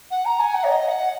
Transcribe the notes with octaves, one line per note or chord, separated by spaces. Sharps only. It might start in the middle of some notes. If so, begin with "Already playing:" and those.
F#5
A#5
G#5
F#5
C#5
D#5
F#5